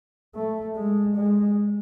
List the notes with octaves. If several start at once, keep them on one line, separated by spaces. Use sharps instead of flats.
A3
G#3
G#3